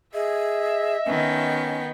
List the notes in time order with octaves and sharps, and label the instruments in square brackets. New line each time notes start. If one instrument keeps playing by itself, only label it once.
[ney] G#4 [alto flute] D#5 [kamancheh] E5
[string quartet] D#3 B3 G5 [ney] C#4